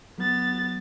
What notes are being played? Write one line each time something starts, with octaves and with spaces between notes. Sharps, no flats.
F#3 B3 A6